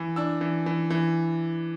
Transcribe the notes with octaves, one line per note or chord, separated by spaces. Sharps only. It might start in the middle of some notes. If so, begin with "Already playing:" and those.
Already playing: E3
D4 E6
E3
E3
E3